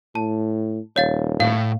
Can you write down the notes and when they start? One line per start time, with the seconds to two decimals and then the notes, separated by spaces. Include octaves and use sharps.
0.15 A2 A5
0.96 D#1 C#5 F5 A6
1.40 A2 F5